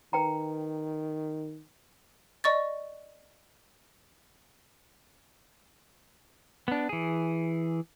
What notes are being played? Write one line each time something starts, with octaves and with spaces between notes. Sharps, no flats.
D#3 B4 G5 A#5
D5 D#5 C#6 A6
B3 D4
E3 G#4